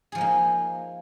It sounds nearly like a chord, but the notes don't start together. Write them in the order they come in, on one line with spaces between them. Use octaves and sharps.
G#4 F3 D#4 A#3